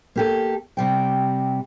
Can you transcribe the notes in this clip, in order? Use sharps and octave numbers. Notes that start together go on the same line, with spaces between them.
A#3 G4 A4
C3 G3 G5